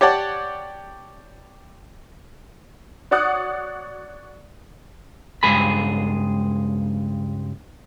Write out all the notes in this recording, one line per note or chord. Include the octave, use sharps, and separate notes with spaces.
G4 C#5 D5 F#5 A5
F#4 C#5 D5 F#5 D#6 F#6
C#2 G2 G#3 G#4 B5